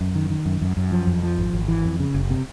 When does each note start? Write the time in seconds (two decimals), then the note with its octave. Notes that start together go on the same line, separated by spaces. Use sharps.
0.01 F#2
0.15 D#3
0.30 D#3
0.45 F#2
0.61 F#2
0.77 F#2
0.92 F3
1.07 F2
1.23 F3
1.38 G#1
1.53 G#1
1.68 E3
1.85 F2
2.00 C#3
2.14 F#1
2.30 C3